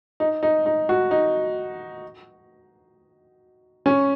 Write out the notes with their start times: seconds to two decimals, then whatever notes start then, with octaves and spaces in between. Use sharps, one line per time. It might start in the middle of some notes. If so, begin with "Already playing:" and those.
0.20 D#4
0.43 D#4
0.66 D#4
0.89 F#4
1.11 D#4
3.86 C#4